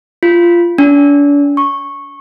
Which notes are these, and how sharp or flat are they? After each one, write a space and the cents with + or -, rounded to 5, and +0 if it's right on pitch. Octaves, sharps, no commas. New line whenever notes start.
F4 -15
D4 -40
C#6 -10